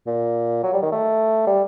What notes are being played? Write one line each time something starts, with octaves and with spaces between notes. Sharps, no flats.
A#2
F#3
G3
D#3
A3
G3